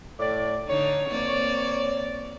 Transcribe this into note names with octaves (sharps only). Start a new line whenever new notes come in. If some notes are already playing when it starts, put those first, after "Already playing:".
A2 D5
D3 D#4 C#5
A#3 C4 D5